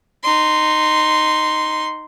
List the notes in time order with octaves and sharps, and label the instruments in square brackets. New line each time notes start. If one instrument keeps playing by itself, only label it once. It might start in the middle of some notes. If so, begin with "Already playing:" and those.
[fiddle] D#4 C6